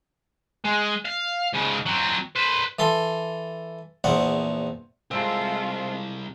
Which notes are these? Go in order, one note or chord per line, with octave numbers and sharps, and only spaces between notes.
G#3
F5
G#2 C#3
F#3 C4
B4 C5
E3 A4 C6
A#1 E2 C4 F#5
C2 G#3 A3 C4 F4